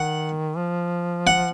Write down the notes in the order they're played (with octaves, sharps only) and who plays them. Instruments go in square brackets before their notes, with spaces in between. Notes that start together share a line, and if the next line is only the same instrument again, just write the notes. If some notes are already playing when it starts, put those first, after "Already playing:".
Already playing: [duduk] D#3 [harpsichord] F#5
[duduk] F3
[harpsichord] F#5